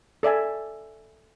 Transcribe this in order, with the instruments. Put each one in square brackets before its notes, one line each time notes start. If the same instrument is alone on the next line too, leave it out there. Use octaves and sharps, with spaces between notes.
[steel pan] A4 D5 E5 G#5